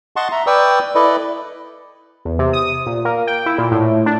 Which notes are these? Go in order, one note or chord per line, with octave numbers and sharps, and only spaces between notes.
D#5 F#5 A5 C6 C#6
E5 A#5
B4 D5 G5 C#6 D#6 E6
E4 A4 B4 D5 D#5
E2
C3
D#6
A#2
A#3
G5
E4
A#2
A2
D4